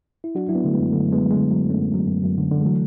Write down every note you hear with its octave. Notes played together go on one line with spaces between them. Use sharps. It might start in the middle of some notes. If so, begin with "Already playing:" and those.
E4
F#3 D4 F#4
F#3 E4
B3 D4
D3 A3
G#3 B3
F#2
D3 F#3 A3
F#2
G#3 B3
F#3
G#3
D3
F#3
F#2
A3 C#4
F#2
F#3
F#2
F#2
D3
D3
G#3
E3 F#3 A3